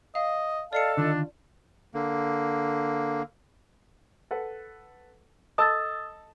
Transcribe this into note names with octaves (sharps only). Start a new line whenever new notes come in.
D#5 F5
A4 D5 D#5 F5 A5 C7 C#7
D3 D#3 D4 F4
D3 A#3
A4 B4 F#5
A4 D#5 A5 D#6 E6 A6